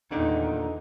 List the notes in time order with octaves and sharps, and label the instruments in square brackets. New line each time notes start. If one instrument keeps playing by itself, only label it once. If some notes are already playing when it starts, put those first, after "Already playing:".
[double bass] E2 D#4 [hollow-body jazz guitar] A#2 D3 D#3